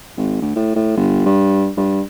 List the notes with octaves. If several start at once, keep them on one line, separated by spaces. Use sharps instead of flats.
G#1
D2
A2
A2
G1
G2
G2